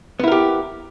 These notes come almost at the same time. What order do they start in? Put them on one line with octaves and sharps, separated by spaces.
B3 E4 A#4 G4